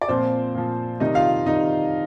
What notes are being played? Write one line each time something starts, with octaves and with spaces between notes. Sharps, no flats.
D5
A#2 F3 C4 C5
A#2 F3
C3 D#3 G3 D#4 D#5
F4 F5
C3 D#3 G3 D#4 D#5